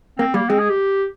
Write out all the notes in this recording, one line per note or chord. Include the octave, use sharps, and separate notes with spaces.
A#3 C4
G3 A#3
G#3 C4
G#4
G4